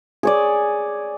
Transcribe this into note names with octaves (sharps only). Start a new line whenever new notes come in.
G#4 C#5 D5